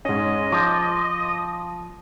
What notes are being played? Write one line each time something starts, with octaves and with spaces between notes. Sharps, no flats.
G#2 C#4 D#5
F3 D6